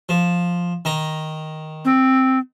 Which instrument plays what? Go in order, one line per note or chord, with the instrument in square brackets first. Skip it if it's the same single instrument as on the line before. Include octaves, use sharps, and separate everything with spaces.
[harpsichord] F3
D#3 A#5
[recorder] C4